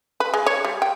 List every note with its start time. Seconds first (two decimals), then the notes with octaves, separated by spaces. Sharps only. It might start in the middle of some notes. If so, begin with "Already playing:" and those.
0.20 B4
0.34 G#3
0.46 C#5
0.65 G3
0.82 G5